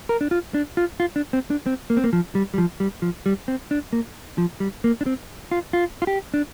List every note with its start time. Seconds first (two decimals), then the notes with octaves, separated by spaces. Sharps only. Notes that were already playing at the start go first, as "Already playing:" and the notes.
0.09 A#4
0.21 D4
0.31 F4
0.54 D4
0.77 F4
1.00 F4
1.16 D4
1.33 C4
1.50 D4
1.66 C4
1.90 A#3
1.97 C4
2.04 A#3
2.13 F3
2.35 G3
2.54 G3
2.58 F3
2.80 G3
3.02 F3
3.26 G3
3.48 C4
3.71 D4
3.93 A#3
4.38 F3
4.60 G3
4.84 A#3
5.01 D4
5.06 C4
5.51 F4
5.73 F4
6.02 F4
6.07 G4
6.34 D4